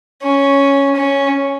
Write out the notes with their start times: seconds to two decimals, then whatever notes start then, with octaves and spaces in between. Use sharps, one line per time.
0.22 C#4
0.95 C#4